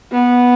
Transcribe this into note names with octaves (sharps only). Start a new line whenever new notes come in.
B3